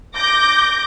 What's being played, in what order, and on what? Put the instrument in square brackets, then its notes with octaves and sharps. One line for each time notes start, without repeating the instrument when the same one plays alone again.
[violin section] D6 G6 A#6